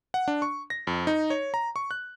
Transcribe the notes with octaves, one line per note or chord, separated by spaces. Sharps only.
F#5
D4
C#6
A#6
F2
D#4
C#5
A#5
C#6
F#6